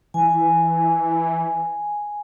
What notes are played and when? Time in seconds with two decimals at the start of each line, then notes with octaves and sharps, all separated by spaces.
0.14 E3 G#5